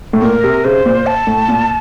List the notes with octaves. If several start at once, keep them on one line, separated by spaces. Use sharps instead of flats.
A2
A#2 A#4
C3
C#3 C5
A#2
A5
A2
A#2